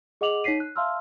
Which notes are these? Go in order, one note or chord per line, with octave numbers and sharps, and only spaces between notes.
G#4 D#5 F#5 D6 F7 F#7
D#4 C#5 B6 C7 D#7
F#6
E5 F5 A5 C6 E6 F6